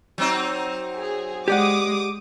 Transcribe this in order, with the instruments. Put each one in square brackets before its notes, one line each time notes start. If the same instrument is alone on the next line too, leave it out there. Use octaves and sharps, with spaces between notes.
[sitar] F#3 C4 D#4
[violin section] G#4
[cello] G#3 [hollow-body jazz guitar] G4 D5 F#5 [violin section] D6 D#6